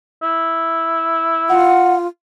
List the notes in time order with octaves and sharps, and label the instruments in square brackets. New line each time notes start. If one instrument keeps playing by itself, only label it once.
[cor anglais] E4
[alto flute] F4 [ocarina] F#5